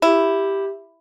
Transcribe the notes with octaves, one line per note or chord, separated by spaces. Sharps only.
E4 G4